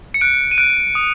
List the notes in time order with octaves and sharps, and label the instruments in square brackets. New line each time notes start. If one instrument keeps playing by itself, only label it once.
[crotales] C#7
F#6 D7
D#7
F#6 D7
D#6